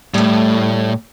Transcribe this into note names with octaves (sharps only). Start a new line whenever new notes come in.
A2 G3 A3